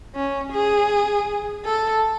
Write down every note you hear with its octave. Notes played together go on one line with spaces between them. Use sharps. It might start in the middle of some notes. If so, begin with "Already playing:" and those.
C#4
G#4
A4